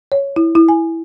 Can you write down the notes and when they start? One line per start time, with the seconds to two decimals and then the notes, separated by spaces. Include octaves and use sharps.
0.12 C#5
0.36 E4
0.55 E4
0.68 G#5